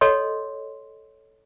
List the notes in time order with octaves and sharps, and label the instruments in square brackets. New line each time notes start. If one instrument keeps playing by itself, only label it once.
[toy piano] A4 C#5 D#5 C6